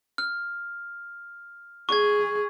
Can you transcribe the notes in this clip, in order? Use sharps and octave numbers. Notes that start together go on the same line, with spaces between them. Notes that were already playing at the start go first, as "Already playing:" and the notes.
F6
G#4 C#6 G#6